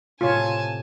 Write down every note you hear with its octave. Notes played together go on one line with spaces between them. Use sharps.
A2 C3 F4 C#5 G#5 A5